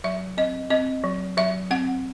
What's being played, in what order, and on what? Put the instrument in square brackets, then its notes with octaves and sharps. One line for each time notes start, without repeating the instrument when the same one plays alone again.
[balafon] F#3 E5
C4 D#5
C4 D#5
F#3
F#3 E5
C4 F#5